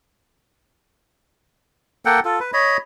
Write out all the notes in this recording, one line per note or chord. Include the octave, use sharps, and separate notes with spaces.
A#3 A4 F#5 G5
F4 A4
B4
C#5 D#5 B5